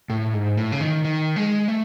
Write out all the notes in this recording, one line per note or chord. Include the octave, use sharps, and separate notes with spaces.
A2
G#2
A2
C#3
D#3
D#3
G#3
A3